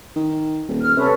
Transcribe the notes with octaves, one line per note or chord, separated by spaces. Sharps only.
D#3
D#1
F6
C3 C#4 A4 B4